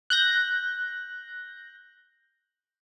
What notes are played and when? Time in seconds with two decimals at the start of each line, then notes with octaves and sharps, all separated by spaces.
0.10 F#6 G6 A#6